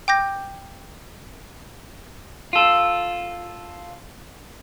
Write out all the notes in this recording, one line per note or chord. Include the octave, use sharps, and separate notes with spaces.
G5 D6 G6 A#6
F4 A4